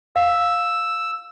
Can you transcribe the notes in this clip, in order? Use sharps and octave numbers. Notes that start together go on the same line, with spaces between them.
F5 E6